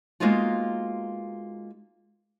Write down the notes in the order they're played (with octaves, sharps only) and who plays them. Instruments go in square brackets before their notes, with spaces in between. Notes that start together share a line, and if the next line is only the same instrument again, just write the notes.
[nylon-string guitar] G#3 A#3 B3 D#4 F4 F#4